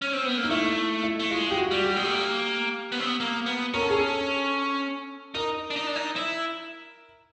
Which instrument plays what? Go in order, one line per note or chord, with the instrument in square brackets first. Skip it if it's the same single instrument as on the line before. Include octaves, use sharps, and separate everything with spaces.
[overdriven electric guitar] C#4
C4
B3
A#3
[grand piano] D#4
[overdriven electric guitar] A3 [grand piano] E4
[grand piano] E4
[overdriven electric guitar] A3
[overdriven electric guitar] G#3 [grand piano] F4
[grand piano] G4
F#4
[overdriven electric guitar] G3
[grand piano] G4
[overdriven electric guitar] G#3
A3
A#3
B3
C4
B3
A#3
B3
[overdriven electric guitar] C#4 [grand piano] A#4
[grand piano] A4
G#4
A4
[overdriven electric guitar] D#4 [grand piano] A#4
[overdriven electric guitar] D4
D#4
D4
D#4
E4